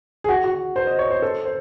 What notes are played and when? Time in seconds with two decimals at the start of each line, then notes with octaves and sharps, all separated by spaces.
0.24 G#4
0.29 F#4
0.44 F#4
0.76 C5
0.87 D#5
0.99 C#5
1.11 C5
1.22 A4
1.45 C5